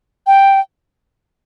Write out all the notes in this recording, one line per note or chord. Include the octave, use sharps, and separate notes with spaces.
G5